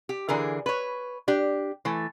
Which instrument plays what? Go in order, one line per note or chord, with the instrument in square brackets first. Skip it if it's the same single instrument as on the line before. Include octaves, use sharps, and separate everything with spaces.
[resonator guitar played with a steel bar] G4
D3 E3 G#4 A#4
B4 C#5
D4 G4
E3 A3